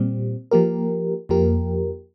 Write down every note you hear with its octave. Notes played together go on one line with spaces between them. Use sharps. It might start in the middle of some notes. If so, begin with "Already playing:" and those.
Already playing: A#2 G3 C4
F3 A#3 G4 A#4
F2 F3 A#3 G4 A#4